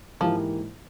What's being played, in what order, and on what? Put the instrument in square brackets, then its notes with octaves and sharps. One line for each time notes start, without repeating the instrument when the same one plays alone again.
[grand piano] G#2 E3 A#3 E4 G4 [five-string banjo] F3